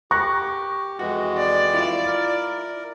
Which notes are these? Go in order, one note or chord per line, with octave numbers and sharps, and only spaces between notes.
G4 C#6 F#6 A#6
F2 E3 G#3 F#4
D5
E4 F4
A#4